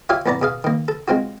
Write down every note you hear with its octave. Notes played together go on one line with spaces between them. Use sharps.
F4 G4 C#5 E5 F5 G#5
F2 A2 B3 D5 A#5
B2 G#4 F5
D#3 A#3
A4
G#3 C4 F4 F#4